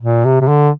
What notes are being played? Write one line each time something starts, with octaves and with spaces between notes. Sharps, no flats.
A#2
C3
C3
D3